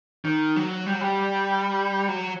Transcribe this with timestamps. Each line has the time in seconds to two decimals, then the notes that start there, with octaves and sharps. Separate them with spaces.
0.25 D#3
0.56 F#3
0.86 G3
0.93 F#3
1.01 G3
2.08 F#3